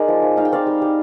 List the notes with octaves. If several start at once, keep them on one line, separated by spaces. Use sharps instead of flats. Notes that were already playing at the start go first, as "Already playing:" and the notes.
Already playing: G#3 D#4 A#4 D5
F3
F3
D#4 F5
G5
C4 D5 F5
G3
G3